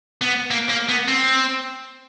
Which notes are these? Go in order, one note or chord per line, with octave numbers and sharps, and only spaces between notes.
B3
A#3
A#3
B3
C4